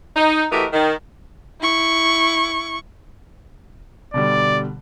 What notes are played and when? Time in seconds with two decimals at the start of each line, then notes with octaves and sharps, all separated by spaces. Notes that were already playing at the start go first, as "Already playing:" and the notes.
0.16 D#4
0.51 E3 A3 F#4 G4 A#4 D#5
0.73 D#3
1.61 E4 C#6
4.14 B2 D3 G3 D5